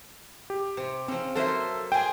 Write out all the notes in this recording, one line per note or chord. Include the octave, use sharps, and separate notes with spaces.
G4
C3
C#3 F3 C4
F#3 A#3 A4 C5 E5
G#4 C5 G5 G#5